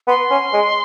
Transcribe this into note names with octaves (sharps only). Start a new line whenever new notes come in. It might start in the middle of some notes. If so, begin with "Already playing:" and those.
B3 C6
C#4
G#3